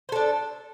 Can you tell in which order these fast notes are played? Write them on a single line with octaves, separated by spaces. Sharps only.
C5 A4 D4